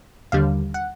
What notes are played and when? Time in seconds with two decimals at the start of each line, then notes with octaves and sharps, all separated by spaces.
0.32 D#2 D3 G3 F5
0.74 F#5